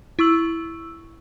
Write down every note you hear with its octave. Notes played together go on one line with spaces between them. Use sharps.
E4 C#6 E6 F#7